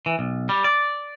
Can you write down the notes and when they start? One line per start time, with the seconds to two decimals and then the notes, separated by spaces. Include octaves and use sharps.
0.06 E3
0.19 B1
0.49 G3
0.64 D5